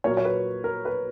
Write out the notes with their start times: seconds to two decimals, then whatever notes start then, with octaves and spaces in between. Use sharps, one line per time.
0.04 A#2 F#3 A#3 A#4 C#5
0.17 C#5
0.25 B4
0.64 A#4
0.85 B4